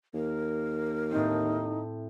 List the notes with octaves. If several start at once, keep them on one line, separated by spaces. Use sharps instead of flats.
D#2 A#4
A2 C4 D#4